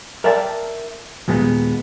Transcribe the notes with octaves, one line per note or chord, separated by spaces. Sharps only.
A#4 D5 E5 G5 A5
D#2 A#2 G#3 B3